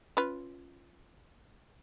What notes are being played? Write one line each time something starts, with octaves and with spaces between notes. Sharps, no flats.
C#4 F4 B4